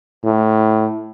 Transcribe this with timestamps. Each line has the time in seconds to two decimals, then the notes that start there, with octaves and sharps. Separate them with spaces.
0.24 A2